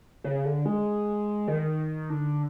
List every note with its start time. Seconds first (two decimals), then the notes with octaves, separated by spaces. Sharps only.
0.24 C#3
0.45 D3
0.66 G#3
1.48 D#3
2.10 D3